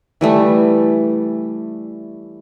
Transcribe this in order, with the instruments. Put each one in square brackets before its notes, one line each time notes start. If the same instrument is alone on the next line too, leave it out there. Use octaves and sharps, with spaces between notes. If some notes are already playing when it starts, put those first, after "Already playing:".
[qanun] E3 G3 A3